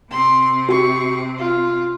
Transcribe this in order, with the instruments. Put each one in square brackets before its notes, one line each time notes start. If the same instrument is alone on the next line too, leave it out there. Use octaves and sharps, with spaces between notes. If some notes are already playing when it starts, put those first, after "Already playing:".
[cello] C3 C4 [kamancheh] C6
[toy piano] F#4 [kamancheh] G4 C#6
[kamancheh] F4